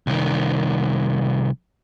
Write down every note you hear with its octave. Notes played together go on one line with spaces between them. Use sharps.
C2 D#3